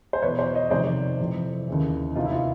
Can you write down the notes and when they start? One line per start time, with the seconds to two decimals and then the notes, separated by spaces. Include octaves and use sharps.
0.13 C5
0.22 E2 B2 B4 C#5
0.39 C5 D5
0.54 C#5 D#5
0.70 F2 C3 D#3 C5 D5
1.19 F2 C3 E3
1.67 D#2 C#3 E3
2.15 E2 C3 E3 D#4 F4
2.26 E4
2.32 F4